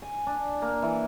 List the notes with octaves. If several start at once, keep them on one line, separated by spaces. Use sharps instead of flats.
G#5
D4
A#3
E3